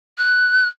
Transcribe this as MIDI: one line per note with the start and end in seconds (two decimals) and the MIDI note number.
0.18 0.67 90